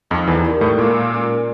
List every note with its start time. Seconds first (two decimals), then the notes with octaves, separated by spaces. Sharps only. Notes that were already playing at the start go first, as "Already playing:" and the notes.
0.11 F2 F3 D#4
0.27 E2 E3
0.45 G4 A#4 D5
0.61 A2 A3
0.78 A#2 G#3 A#3
1.12 C#4 F4 A#4 D5